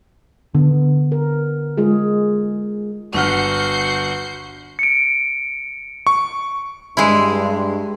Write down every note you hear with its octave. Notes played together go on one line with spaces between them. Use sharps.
D3 B3
A#4
G#3 F4 G#4
G1 F#4 F#5 F6 G6 C7 C#7
C#7 D7
C#6
G2 G#3 E4